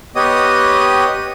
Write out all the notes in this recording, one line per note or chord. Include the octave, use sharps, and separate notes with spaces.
B3 G4 C#5 D#5 D#6